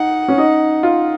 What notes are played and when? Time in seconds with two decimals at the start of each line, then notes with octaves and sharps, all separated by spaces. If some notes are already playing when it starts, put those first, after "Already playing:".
Already playing: D#4 F#5
0.28 C#4
0.38 D#4
0.83 F4